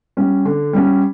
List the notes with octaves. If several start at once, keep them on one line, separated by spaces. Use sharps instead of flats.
G3 C#4
D3
G3 C#4